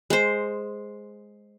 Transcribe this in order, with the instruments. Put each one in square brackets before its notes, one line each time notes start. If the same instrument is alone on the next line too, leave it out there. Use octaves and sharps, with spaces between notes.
[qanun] G#3 C5